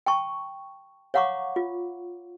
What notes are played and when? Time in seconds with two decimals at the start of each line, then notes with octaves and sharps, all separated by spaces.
0.06 G5 A5 C#6
1.14 C#5 F5 F#5 A#5 C#6 D6
1.56 F4